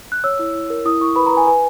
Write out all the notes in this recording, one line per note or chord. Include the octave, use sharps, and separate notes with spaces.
F#6
C#5 E6
E4
E4
A#4
E4 D#6
E4 C#6
B4 B5
B4 A#5
G#5
B4 G#5